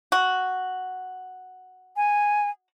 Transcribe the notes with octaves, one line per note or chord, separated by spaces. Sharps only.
F#4
G#5